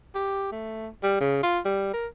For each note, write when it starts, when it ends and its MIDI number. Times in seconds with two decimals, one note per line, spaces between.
0.15 0.52 67
0.52 0.89 57
1.03 1.17 55
1.20 1.39 49
1.43 1.59 65
1.65 1.90 55
1.94 2.07 70